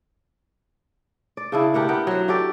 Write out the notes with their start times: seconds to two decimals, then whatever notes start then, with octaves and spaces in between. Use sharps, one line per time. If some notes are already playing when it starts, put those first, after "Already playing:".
1.37 D5
1.52 C#3 D4 E4
1.74 D4 G4 A#4 F#5
1.88 B3 A#4 F#5 G5
2.07 F#3 C5
2.28 F#4 G4 A4 D5